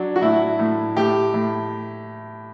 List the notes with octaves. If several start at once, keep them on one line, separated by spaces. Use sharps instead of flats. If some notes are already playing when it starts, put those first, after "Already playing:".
Already playing: F#3 D4
F#4
A2 E4
A2
A2 G4
A2